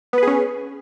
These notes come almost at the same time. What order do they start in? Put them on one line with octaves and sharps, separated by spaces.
B3 B4 G#4 C#4